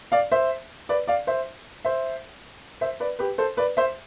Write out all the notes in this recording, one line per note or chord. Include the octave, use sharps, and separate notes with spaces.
D5 F5
C5 E5
B4 D5
D5 F5
C5 E5
C5 E5
C5 E5
B4 D5
G4 B4
A4 C5
B4 D5
C5 E5